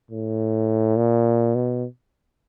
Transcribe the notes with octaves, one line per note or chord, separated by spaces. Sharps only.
A2
A#2
B2